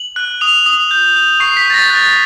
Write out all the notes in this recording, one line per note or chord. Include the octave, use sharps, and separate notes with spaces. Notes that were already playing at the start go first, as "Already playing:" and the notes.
Already playing: F#7
F#6
D#6 F7
D#6
G6
G6
C#6 C7
B6
C#6 A6
A#6
F#6 A6